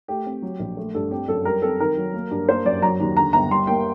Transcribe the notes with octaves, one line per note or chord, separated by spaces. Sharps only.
A3 G4
C4
F#3
A#1
A3
G2 A4
C4 G4
F#2 A4
G3 A#4
C4 A4
D#3 A#4
F#3
A#3
G2
A#3 C5
F#2 D5
F#3 A#5
D#2
D3 A#5
G1 A#5
G3 C6
A#3 G5